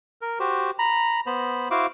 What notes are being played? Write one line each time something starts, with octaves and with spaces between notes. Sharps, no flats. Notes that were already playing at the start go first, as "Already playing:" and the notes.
A#4
F#4 G4 C5
A#5 B5
B3 C5 B5
E4 F#4 C5 F5 D6